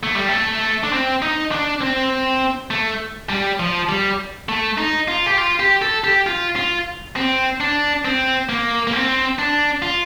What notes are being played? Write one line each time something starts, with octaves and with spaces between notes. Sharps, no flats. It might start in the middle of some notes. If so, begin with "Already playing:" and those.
A3
G3
A3
D4
C4
D#4
D4
C4
A3
G3
F3
G3
A3
D#4
F4
G4
F4
G4
A4
G4
F4
F4
C4
D4
C4
A#3
A#3
C4
D4
F4